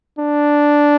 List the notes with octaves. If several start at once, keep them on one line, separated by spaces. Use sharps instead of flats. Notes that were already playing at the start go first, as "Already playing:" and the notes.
D4